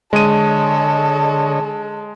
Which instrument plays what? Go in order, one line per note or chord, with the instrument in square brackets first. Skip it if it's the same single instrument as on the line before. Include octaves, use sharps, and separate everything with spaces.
[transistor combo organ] D3 C#5 D#5 [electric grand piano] G#3 D#7 [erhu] A4